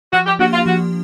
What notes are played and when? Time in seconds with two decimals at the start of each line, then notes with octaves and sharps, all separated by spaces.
0.13 F3 F#4
0.26 G4
0.39 A#3 D4 F#4 G4
0.53 F4
0.66 F3 F#4